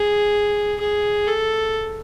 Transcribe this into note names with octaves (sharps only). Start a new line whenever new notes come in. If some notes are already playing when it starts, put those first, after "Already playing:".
Already playing: G#4
G#4
A4